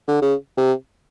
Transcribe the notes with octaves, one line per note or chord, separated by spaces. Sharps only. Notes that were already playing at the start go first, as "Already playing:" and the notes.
D3
C#3
C3